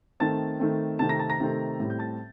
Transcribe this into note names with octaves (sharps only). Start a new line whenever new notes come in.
D#3 A3 C4 A5 A6
D#3 A3 C4
C3 D#3 A3 C4 A5 A6
A#5 A#6
A5 A6
A#5 A#6
C3 D#3 A3 C4
A2 G3 C4
G6
A5 A6